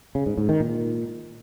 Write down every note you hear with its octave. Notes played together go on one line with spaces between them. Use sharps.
C#3
G#2
G#2
D#3
A#2